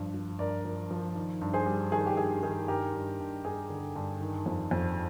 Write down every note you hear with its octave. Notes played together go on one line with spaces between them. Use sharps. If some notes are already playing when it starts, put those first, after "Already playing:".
Already playing: G2 F3
F3
G2 A#4 D5
F3
F3
D#3
G2
G#4 C5
G3
D#3 G#4
G4
G2 G#4
D#3 G#4
G2 G4 A#4
G2
G2
G2 G#4
D3
G2
D#3
F2
F2